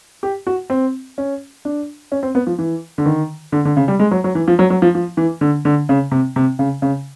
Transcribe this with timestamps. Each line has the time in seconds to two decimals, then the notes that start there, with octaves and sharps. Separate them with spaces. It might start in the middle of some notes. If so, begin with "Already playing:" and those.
0.23 G4
0.47 F#4
0.70 C4
1.18 C#4
1.65 D4
2.12 C#4
2.23 C4
2.35 B3
2.47 F3
2.59 E3
2.98 D3
3.06 D#3
3.52 D3
3.65 D3
3.77 C#3
3.88 G3
3.99 G#3
4.11 F#3
4.24 F#3
4.35 E3
4.48 F3
4.59 F#3
4.70 F#3
4.82 F3
4.95 F3
5.17 E3
5.41 D3
5.65 D3
5.89 C#3
6.11 C3
6.36 C3
6.59 C#3
6.82 C#3